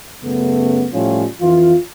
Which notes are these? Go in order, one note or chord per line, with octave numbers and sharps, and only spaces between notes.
F#2 C#3 A3 B3
A2 F3 G3 C#4 F4
F2 E3 F4